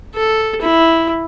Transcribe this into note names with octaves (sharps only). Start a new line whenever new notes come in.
A4
E4